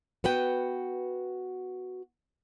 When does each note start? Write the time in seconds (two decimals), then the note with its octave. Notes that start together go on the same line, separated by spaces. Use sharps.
0.24 B3 F#4 B4 G5